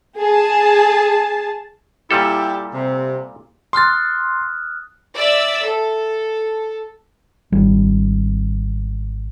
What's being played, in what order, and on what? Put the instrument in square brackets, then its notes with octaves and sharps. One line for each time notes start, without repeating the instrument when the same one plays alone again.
[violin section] G#4 A5
[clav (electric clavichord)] A#2 G3 A4 [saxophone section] E4 G4
[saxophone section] C3
[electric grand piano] C6 A6 [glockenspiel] D#6 F6 F#6
[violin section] D5 E5 E6
A4
[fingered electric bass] G#1 G3